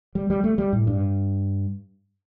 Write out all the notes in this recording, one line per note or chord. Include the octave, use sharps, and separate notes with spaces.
G3
G3
A3
G3
A2
G2